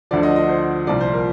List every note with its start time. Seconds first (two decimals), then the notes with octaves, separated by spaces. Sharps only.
0.11 D2 D3 F3 D5
0.23 D#5
0.36 D#5
0.49 C5
0.87 C2 A#2 F3 D5
1.01 C5
1.14 A#4